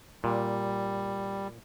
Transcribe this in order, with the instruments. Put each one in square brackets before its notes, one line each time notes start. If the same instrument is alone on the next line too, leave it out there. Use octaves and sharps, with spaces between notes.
[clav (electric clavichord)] A#2 [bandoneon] G3